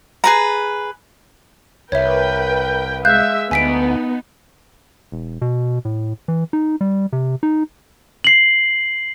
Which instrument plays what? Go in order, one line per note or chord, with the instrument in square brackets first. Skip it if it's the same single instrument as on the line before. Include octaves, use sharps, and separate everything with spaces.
[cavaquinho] G#4 B4 A#5
[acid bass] C2 [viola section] A#4 B4 G5 [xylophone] C#5 E5
[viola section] G#3 E5 [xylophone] F5 F#6 G6
[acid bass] D2 [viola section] B3 D#4 [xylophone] G#5 B6 D7
[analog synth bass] E1
B2
A2
E3
D#4
G3
C3
D#4
[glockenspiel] C7 F#7